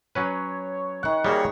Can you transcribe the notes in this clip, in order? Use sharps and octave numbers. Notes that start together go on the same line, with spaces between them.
F#3 C#4 B4 C#5
D#3 F#5
G3 A#3 F#4 G#4 C#5